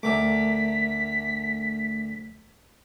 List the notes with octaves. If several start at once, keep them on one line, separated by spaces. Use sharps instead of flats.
D2 A3 A#4 E5 D6 B6